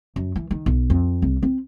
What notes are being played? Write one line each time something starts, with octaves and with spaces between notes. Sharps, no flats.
F#2
E3
D#3
B1
F2
C2
C4